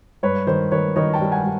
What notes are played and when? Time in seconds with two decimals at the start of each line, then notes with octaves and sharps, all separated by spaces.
0.23 G2 B4 C#5
0.47 D#3 C5
0.71 D#3 B4 C#5
0.96 D#3 C#5 D#5
1.14 G5 A5
1.20 G3
1.32 F#5 G#5
1.44 G3